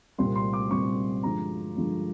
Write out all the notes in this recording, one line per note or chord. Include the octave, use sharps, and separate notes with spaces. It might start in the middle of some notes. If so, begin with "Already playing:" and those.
C2 A#2 G3 C4 C6
C6
D6
C2 A#2 G3 C4 C#6
G2 D3 F3 G#3 A#5
G2 D3 F3 G#3